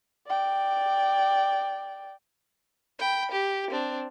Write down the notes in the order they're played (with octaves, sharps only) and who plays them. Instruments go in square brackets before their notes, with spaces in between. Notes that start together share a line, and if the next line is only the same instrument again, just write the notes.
[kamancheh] D5 G5
[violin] G5 B5
G4
C4 D4